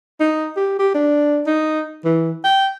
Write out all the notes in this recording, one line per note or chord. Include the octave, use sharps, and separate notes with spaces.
D#4
G4
G4
D4
D#4
E3
G5